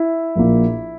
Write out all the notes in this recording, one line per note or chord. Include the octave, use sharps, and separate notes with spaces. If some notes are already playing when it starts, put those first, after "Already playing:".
Already playing: E4
A#1 A#2 A#3